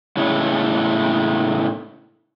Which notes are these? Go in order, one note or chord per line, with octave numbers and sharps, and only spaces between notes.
A2 C#3 G#3 A3